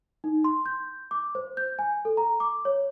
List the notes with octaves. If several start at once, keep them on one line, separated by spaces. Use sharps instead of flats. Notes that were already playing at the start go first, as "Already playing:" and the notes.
D#4
C6
G6
D6
C5
G6
G#5
A4
A#5
D6
C#5